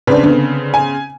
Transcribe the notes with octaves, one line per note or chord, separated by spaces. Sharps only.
C#3 C4 D4 B4
D3 B3
G#5